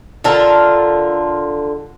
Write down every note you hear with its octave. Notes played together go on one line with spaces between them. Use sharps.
D3 F4 A4 A#4